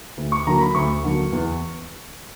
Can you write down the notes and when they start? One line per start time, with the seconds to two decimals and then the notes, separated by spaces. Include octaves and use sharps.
0.17 D2
0.32 C#6
0.46 D3 F#3 A#3 A#5
0.61 B5
0.75 D2 C#6
1.04 D3 F#3 A#3
1.32 E2